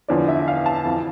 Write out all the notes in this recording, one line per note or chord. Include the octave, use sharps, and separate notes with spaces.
E2 D3 F3 D5
E5
F5
A5
F2 E3 A5